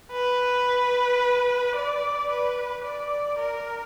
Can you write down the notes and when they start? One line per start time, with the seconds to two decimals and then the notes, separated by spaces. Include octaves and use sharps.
0.12 B4
1.76 D5
2.30 B4
2.84 D5
3.39 A#4